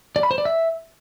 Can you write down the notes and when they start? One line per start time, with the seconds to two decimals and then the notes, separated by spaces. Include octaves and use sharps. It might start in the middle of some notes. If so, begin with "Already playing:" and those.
0.16 D5
0.23 B5
0.31 C5
0.38 D5
0.45 E5